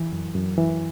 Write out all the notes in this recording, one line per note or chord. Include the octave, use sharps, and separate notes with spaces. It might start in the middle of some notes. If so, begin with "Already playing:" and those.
Already playing: E3
F#2
F#2
E3